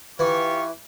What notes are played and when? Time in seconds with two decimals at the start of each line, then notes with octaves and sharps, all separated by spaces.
0.19 E3 F4 G4 C#6